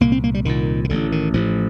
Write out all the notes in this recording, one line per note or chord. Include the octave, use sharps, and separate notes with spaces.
C2 A#2 A#3
C4
A#3
G3
C2 A#2 D#3
D#3
A1 A2 D3
D#3
A1 A2 F3